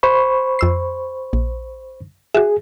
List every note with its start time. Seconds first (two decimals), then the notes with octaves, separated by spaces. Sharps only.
0.03 C5 B5 C#6
0.59 F2 E6 C7
1.33 A#1
2.35 F#4 G#4 E5